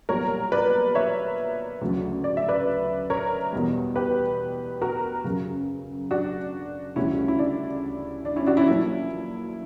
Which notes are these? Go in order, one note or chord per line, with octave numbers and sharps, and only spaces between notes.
B1 A#2 G3 A#4 C#5
B4 D5
C#5 E5
D2 C#3 F#3
D5
E5
B4 D5
A#4 C#5
E2 B2 G3
G4 B4
F#4 A#4
F#2 C#3 F#3
D4 F#4
D2 C#3 E3 G3 C#4 E4
E4
D4
D4
C#4 E4
D4 F#4
C#4 E4
A#1 A#2 F#3 C#4 E4